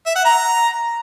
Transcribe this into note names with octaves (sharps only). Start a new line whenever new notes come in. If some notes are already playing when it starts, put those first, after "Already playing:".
E5
F#5
A#5